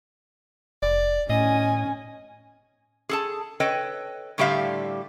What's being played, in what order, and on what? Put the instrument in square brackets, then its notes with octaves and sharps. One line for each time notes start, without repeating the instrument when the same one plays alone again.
[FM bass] F1 [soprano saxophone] D5
[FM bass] A2 [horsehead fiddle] C#4 G#5 [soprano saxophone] D#5
[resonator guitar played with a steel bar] G#4 A4 A5
A4 B4 C#5 D#5 G5
A2 D3 G3 G4 E5 F5